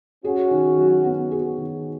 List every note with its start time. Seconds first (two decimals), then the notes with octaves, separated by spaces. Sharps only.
0.24 C#4 F#4 G#4
0.51 D#3
0.78 F#3
1.05 B3
1.31 G#4
1.58 D#3